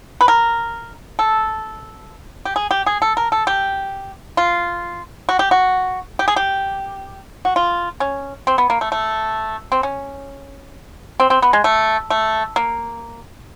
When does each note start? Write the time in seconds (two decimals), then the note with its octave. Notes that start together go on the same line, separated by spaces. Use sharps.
0.21 B4
0.28 A#4
1.19 A4
2.45 G4
2.56 G#4
2.71 G4
2.86 G#4
3.02 A4
3.17 A#4
3.32 A4
3.47 G4
4.37 F4
5.29 F#4
5.39 G4
5.51 F#4
6.19 G4
6.28 G#4
6.36 G4
7.45 F#4
7.56 F4
8.00 C#4
8.47 C4
8.58 B3
8.70 A#3
8.81 A3
8.92 A3
9.72 C4
9.83 C#4
11.20 C4
11.30 C4
11.42 B3
11.53 G#3
11.64 A3
12.10 A3
12.56 A#3